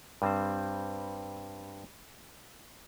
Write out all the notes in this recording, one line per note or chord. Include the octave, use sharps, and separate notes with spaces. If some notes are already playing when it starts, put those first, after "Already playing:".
G2 G3 C4 C5